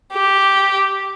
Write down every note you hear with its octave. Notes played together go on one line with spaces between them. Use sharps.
G4